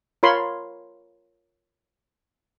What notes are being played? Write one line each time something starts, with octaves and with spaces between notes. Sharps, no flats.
F4 A#4 C#5 B5 C6